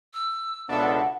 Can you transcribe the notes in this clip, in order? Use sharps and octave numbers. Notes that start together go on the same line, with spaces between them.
E6
C#2 B2 B3 D4 A4 E5 F#5